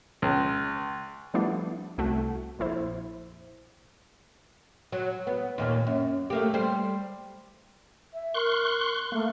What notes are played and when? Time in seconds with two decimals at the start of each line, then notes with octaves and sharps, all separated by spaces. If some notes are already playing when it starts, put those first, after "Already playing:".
0.22 C#2
1.34 F3 G3 A3 B3 D4 E4
1.98 C2 A3 F#4
2.59 A#1 F2 E4 C5
4.92 F#3
5.27 B3
5.58 D#2 A#2 A#3
5.87 F#2
6.30 A3 A#3 G4
6.54 G3 C5
8.14 E5
8.34 A#4 C6 C#6 F#6
9.12 A3 A#3